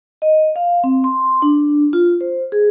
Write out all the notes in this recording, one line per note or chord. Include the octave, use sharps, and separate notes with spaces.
D#5
F5
C4
C6
D4
F4
C5
G#4